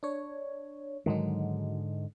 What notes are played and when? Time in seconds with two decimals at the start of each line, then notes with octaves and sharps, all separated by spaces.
0.03 D4 C#5
1.06 G#2 D3 D#3 F#3 G#3 D#4